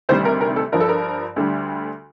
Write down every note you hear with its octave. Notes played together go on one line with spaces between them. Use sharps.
D2 C3 D#3 G3 C5
A#4
A#4
A4
G2 F3 A#4
A4
A#4
D2 D3 G3